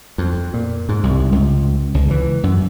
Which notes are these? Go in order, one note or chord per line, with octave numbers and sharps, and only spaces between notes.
F2
A#2
G#2
C2
C#2
C#2
E3
F#2